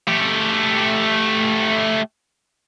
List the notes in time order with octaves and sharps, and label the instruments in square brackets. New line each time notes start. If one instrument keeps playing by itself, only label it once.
[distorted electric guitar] A3 G4